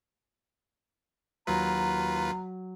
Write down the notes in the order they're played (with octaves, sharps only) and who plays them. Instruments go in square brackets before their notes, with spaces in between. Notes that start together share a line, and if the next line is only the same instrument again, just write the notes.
[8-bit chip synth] D#2 F4 B4 [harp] F#3 [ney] A#5